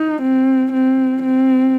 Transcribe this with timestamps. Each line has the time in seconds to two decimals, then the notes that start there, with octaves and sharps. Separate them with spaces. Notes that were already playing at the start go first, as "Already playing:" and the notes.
Already playing: D#4
0.22 C4
0.73 C4
1.23 C4